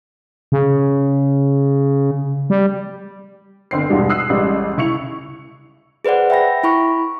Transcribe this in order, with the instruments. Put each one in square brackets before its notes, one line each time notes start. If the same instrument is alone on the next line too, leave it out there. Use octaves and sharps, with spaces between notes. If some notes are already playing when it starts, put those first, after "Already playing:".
[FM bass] C#3
G3
[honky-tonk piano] G1 C4 C7
E2 G2 B2 G3 G#3
D#6 E6 F#6 C7
A1 G3 G#3
C#2 E4 C#6 C#7 F7
[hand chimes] G#4 B4 C5 D5 F#5
E5 G5 B5 A#6
E4 B5 C#6